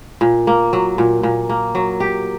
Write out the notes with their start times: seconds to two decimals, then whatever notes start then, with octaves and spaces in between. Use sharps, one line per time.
0.21 A#2
0.47 A#3
0.73 F#3
0.98 A#2
1.23 A#2
1.49 A#3
1.75 F#3
2.00 G4